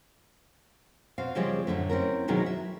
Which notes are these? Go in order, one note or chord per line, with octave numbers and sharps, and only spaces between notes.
B2 C4 F5
C#3 F3 G3 G#3 C4 D5
F#2 A2 D3 A3
C4 C#4 E4 A#4
B2 D#3 F#3 G#3 D#4 E4
E5